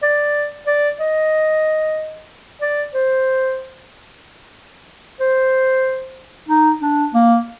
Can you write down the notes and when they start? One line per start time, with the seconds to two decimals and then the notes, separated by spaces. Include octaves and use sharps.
0.03 D5
0.67 D5
1.00 D#5
2.62 D5
2.94 C5
5.20 C5
6.49 D#4
6.82 D4
7.14 A#3